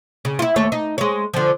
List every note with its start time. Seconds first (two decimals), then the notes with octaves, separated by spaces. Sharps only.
0.25 C#3
0.39 E4 F4
0.56 D#2 A3 C#5
0.72 D#4
0.98 G#3 C#5
1.34 D3 F3